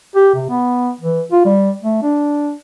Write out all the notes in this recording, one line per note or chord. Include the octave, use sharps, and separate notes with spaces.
G4
C3
B3
E3
F4
G3
A3
D4